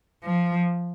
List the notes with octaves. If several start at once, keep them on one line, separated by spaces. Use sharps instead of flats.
F3